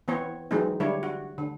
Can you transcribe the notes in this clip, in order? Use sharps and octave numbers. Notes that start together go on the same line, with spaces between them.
E3 B3 C4 C#5
E3 F#3 G#3 C4 D#4
D3 G3 E4 C#5
F#4
D3